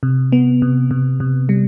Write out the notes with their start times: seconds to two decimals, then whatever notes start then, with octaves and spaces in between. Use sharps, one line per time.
0.03 C3
0.32 B3
0.62 C3
0.91 C3
1.20 C3
1.49 G3